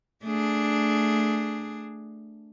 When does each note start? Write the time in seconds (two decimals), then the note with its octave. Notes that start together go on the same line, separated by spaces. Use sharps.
0.23 A3 D4 G#4